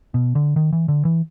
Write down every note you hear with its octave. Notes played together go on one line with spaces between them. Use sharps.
B2
D3
D#3
E3
D3
E3